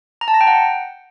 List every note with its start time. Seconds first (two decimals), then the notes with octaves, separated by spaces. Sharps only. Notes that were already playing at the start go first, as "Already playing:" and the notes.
0.21 A#5
0.28 A5
0.34 A#6
0.41 G5
0.47 F#5